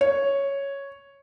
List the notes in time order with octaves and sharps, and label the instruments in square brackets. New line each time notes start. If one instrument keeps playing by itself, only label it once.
[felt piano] C#5